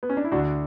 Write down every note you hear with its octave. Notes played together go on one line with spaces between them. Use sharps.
B3
C#4
D4
E4
D2 D3 D4 F#4